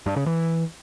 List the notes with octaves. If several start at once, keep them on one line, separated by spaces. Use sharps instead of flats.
G2
C#3
E3